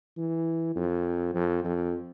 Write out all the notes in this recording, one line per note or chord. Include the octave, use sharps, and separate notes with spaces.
E3
F2
F2
F2